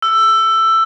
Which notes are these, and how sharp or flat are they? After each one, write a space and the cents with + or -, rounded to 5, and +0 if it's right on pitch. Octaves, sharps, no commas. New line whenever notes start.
E6 +15